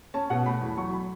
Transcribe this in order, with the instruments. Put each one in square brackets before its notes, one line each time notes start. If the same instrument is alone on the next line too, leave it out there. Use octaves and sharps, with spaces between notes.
[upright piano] C#4 A5
B2 F#5
A3 B5
E2
F#3 C#6
B5